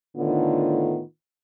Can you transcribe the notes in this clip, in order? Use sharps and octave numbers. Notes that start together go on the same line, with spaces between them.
A2 D3 D#3 B3 F4